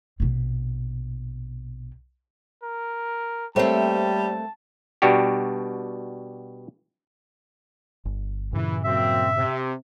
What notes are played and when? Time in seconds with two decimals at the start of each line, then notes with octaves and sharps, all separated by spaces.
0.20 A#1 B2
2.63 A#4
3.56 G3 A3 A#3 C4 C5 C#5 E5 A5
5.02 B2 G3 D4 F#4 G4
8.05 G1
8.53 G2 A#2 C#3 E3
8.85 F#3 A#3 C4 E5
9.35 C3